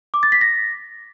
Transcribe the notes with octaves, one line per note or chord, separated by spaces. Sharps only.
D6
A6
B6
A#6